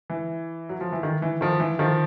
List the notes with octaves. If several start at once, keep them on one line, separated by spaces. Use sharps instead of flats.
E3
F#3
F3
E3
D#3
E3
D#3 F3
E3
D#3 F3